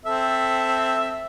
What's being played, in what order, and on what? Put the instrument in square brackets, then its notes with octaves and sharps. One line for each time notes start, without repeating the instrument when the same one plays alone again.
[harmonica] C4 A4 E5